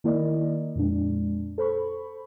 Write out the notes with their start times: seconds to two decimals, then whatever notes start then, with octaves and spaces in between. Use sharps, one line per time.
0.04 D#3 A#3 E4 A#4 D5 D#5
0.76 F2 A#2 G#3 D4
1.58 A4 C5 B5 C#6